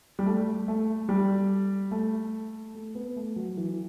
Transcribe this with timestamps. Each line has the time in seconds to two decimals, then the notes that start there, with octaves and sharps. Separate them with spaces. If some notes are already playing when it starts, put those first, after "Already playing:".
0.19 G3
0.26 A3
0.68 A3
1.09 G3
1.91 A3
2.75 A3
2.95 B3
3.16 A3
3.36 F#3
3.57 E3